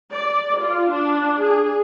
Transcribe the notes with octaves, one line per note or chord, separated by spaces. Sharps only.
D5
F4
D4
G#4